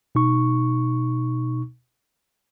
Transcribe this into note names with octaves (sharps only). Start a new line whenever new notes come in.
B2 D#4 C#6